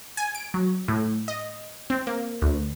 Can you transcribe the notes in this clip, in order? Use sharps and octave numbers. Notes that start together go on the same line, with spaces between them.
G#5
D7
F#3
A2
D#5
C4
A#3
D2